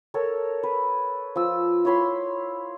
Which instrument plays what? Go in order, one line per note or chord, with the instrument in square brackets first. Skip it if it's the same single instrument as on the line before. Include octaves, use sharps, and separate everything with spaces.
[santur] A4 A#4 C#5
B4
F3 E6
E4 C#5 B5 C6